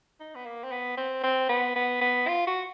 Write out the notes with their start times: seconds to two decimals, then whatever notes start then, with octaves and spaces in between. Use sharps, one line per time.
0.20 D#4
0.35 B3
0.46 A#3
0.64 C4
0.72 B3
0.97 C4
1.23 C4
1.49 B3
1.76 B3
2.01 B3
2.28 F4
2.47 F#4